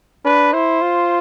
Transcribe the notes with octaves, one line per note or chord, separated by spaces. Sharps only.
D4 B4
E4 C5
F4